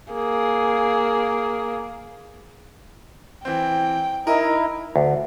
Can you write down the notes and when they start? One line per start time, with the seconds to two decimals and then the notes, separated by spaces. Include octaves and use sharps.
0.12 A#3 G#4
3.45 E3 C4 G5
4.27 D#4 E4 A#4 D#5
4.96 D2